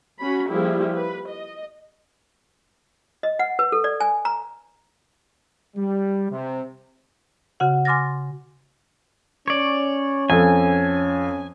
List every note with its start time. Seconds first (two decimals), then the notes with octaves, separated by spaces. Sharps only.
0.20 C#4 F#4 B5
0.49 F3 G3 A#3 E4 G4 G#4
0.94 B4
1.28 D#5
3.23 D#5
3.39 F#5
3.59 B4
3.72 A4
3.84 D5
4.00 G#5
4.25 A#5
5.76 G3
6.31 C3
7.60 C#3 F#4 F#5
7.85 G#5 C6 D6 F6 A6 A#6
9.48 C#4 C#5 D5
10.30 F2 A4 G#5